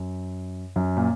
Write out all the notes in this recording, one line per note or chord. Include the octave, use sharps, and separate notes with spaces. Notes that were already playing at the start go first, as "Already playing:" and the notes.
Already playing: F#2
F#2
A#2